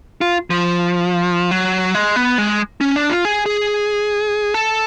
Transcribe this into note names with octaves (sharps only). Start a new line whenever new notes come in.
F4
F3
F#3
G#3
B3
G#3
C#4
D4
F4
G#4
G#4
A4